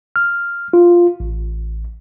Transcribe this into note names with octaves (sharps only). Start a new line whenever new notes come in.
F6
F4
A1